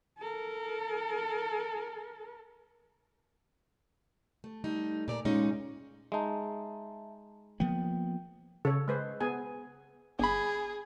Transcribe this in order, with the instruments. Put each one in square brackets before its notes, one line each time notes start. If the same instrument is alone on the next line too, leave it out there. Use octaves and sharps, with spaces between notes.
[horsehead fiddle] A4 A#4
[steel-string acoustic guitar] A3
G3 A3 D#4
A#2 D5 A#5
A#2 G#3 C#4 D#4
[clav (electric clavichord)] G#3 D#4 [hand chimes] E5 A5
[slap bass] F3 A#3 B3 [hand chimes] G5
[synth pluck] C#3 [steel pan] A4 C#5
[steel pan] G#3 B4 C5
B3 G#4 G#5
[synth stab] G1 B5 [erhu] G#4